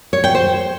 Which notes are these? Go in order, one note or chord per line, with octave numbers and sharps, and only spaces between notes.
C#5
G5
C5